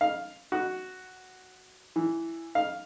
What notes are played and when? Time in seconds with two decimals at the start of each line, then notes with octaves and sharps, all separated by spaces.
0.01 F5
0.52 F#4
1.96 E3
2.55 F5